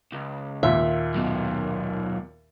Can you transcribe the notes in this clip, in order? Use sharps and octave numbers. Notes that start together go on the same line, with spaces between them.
C#2
D#2 A#2 E5
F#2 B2